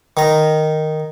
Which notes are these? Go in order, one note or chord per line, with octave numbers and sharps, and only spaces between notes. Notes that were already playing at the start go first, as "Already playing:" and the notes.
D#3 A#5